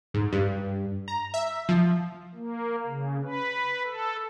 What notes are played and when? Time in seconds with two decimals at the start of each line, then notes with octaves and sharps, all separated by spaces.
0.14 G#2
0.33 G2
1.08 A#5
1.34 E5
1.69 F3
2.35 A#3
2.87 C#3
3.22 B4
3.85 A4